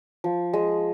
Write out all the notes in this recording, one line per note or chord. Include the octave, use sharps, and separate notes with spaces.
F3
G#3